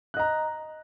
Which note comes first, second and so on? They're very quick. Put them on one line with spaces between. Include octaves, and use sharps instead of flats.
F#6 D#5 A#5